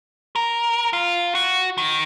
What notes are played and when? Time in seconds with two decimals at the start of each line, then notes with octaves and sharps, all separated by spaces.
0.36 A#4
0.93 F4
1.35 F#4
1.78 D#3